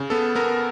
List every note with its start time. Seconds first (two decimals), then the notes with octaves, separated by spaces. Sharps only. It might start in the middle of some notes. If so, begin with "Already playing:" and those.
Already playing: C#3
0.10 B3 A4
0.35 B3 A#4